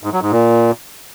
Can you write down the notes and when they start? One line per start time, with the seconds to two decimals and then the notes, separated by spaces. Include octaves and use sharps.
0.04 G#2
0.13 F#3
0.22 G#2
0.32 A#2